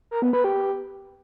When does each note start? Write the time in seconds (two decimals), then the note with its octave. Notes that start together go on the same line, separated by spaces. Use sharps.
0.11 A#4
0.22 B3
0.33 B4
0.44 G4